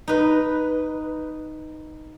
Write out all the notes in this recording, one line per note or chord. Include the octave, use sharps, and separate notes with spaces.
D#4 B4